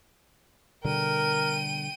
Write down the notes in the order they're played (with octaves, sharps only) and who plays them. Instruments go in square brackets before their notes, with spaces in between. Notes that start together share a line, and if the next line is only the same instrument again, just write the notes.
[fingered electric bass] B2 D3 G3 [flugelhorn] A#4 [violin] G5 D#7